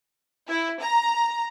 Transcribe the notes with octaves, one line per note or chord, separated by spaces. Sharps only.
E4
A#5